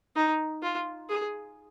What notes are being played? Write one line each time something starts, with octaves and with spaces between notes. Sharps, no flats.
D#4
F4
G#4